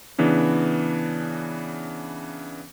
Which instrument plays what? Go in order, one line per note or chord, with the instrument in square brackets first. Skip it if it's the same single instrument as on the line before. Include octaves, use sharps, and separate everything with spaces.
[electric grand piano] C#3 E3 B3 D4